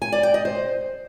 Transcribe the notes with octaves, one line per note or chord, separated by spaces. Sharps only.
G#5
D5
G5
D#5
C5